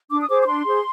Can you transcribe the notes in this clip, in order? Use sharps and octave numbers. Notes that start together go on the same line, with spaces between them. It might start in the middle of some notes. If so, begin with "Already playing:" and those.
D4 D6
D#6
G#4 C5 D6
D6
D4 C6
G#4 C5